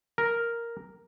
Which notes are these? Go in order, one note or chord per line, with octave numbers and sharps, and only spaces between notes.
A#4